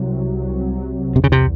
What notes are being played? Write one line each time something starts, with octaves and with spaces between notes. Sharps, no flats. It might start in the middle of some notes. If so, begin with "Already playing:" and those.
Already playing: C2 C3 F#3
F#3
F#3
C2
E2 C3
C#3
C3